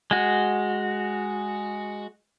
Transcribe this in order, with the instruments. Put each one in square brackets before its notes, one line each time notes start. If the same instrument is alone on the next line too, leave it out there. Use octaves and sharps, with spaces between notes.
[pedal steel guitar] G#3 F#4